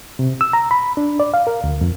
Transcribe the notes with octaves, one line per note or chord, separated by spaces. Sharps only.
C3
E6
A#5
B5
D4
D5
F5
A#4
D2
F2